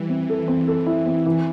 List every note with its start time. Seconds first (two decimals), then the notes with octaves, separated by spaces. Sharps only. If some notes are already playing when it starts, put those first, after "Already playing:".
Already playing: E3 G3 E4
0.09 C4
0.29 A4
0.48 C4
0.68 A4
0.86 E4
1.06 C4
1.26 E3